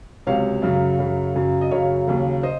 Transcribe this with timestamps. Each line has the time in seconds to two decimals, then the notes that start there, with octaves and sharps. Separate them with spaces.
0.26 C#2 C3 F#3 C#5 F5
0.62 F#2 C#3 F#3
0.99 F#2 C#3 F#3
1.35 F#2 C#3 F#3
1.61 D#5
1.71 F#2 C#3 F#3 C#5 F5
2.07 D#2 C#3 F#3
2.43 C5 D#5